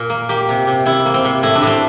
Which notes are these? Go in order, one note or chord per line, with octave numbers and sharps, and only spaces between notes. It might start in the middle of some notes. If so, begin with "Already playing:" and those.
Already playing: A#2 A#4
A#3
A#3 G4
C3
C3
C3 E4
A#3
C4
C3
A2 E4
D4
A2 C4